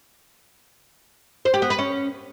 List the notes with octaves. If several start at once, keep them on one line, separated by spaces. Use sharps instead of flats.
C5
G4
B3
B4
C#4